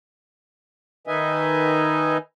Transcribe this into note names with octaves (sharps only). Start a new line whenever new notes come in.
D#3 D#4 B4 D#5 E5 G#5